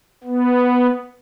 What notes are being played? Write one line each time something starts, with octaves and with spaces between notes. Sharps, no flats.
B3